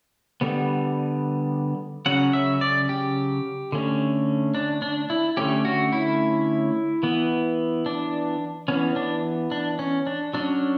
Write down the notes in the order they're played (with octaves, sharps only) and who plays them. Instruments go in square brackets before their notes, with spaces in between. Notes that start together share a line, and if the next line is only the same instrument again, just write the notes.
[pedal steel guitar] D3 G3 B3
C#3 F#3 C#4 F#5
E5
D5
G4
D3 A3 C#4
D4
D4
E4
D3 A3 C#4 G4
F#4
E4
E3 B3
D4
E3 B3 C#4
D4
D4
C#4
D4
F#3 C#4 D4